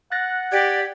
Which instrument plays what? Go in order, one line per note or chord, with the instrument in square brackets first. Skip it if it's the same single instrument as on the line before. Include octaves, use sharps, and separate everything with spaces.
[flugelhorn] F#5 [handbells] F#6 A6 A#6
[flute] G4 [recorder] D5 [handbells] G#6 D7